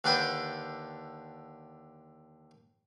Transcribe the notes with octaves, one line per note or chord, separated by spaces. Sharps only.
D#2 D3 D4 B4 G5 B5